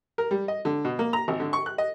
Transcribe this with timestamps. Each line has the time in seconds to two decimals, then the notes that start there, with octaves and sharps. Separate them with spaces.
0.18 A#4
0.31 G3
0.48 D#5
0.65 D3
0.85 B2
0.99 A#3
1.13 A#5
1.28 G#1
1.40 D3
1.53 C#6
1.66 F#6
1.78 D#5